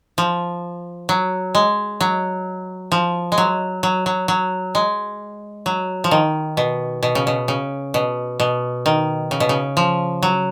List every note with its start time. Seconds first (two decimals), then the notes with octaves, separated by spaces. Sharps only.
0.18 F3
1.09 F#3
1.55 G#3
2.01 F#3
2.92 F3
3.32 G#3
3.38 F#3
3.83 F#3
4.06 F#3
4.28 F#3
4.75 G#3
5.66 F#3
6.04 F3
6.11 D#3
6.57 B2
7.03 B2
7.15 C#3
7.27 B2
7.48 C#3
7.94 B2
8.40 B2
8.86 D#3
9.31 C#3
9.40 B2
9.49 C#3
9.77 F3
10.23 F#3